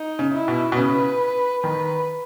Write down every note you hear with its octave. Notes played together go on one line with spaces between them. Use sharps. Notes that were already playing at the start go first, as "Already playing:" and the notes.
Already playing: D#4
C#3
E4
B2
B2
C#3 B4
D#3 B4